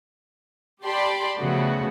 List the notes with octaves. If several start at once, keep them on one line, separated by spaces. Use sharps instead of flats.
G4 D5 G5 A5 B5 C6
C#3 F3 A3 B3 F#4